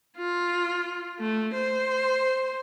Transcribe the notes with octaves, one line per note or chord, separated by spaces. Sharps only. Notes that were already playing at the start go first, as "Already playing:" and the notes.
F4
A3
C5